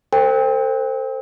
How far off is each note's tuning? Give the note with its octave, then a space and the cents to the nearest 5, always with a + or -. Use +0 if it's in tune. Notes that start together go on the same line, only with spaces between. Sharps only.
A4 +45 C5 +0 G5 +25